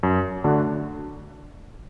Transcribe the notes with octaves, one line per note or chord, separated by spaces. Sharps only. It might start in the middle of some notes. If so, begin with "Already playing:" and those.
F#2
D3 A3 D4 F#4